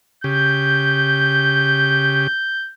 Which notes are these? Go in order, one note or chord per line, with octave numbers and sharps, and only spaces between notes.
C#3 G4 G6